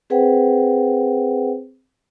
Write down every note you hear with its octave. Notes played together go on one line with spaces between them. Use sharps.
C4 G#4 B4 C5 F#5 G5